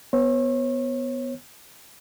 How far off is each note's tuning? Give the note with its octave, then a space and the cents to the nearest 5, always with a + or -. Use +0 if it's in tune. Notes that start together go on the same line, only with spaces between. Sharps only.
B3 +0 C#5 -30